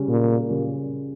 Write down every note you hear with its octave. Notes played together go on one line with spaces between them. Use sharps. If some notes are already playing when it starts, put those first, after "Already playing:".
Already playing: C#3 G3 C#4
A#2
C#3 G3 C#4